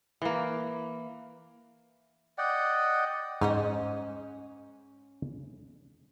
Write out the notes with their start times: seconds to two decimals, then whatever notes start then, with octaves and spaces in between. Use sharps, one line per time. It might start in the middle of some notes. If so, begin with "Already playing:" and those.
0.22 E3 A#3
2.38 D5 D#5 F#5 G5
3.41 G#2 C#4 C5 D#5